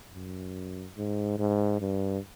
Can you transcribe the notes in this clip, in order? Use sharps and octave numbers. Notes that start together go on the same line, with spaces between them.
F#2
G#2
G#2
G2